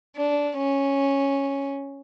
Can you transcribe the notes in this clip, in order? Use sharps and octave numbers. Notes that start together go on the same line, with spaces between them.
D4
C#4